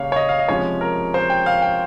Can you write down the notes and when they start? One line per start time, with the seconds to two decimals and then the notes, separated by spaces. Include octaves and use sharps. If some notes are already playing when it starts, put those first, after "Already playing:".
Already playing: C#3 G3 A#3 C#4 C#5 F5
0.12 C#5
0.16 D#5
0.29 F5
0.39 D#5
0.48 C3 F3 G#3 C#4 C#5
0.81 A#4
1.14 C5
1.30 G5
1.46 F5
1.62 G5